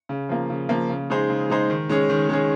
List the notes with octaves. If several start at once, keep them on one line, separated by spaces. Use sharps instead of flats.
C#3
F3 A#3
C#3
F3 A#3
C#3
G#3 D#4 G#4 C5
C#3
G#3 D#4 G#4 C5
D#3
G#3 C#4 G#4
D#3
G#3 C#4 G#4